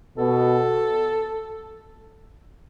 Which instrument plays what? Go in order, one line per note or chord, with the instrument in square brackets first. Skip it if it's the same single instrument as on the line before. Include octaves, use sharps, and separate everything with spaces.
[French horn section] B2 [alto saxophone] A4